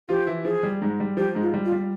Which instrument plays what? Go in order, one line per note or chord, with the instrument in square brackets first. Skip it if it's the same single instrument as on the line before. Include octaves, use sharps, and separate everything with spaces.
[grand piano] F3 F4 [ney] G4
[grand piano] E3 E4
[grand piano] F3 [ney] G#4
[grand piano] G3
G#2 G#3
G3
[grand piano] F3 [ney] G4
[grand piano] G#2 G#3
[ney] F4
[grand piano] G3
[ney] F4
[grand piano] G3